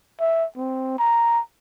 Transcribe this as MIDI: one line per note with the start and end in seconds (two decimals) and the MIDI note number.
0.20 0.45 76
0.57 0.96 60
0.99 1.40 82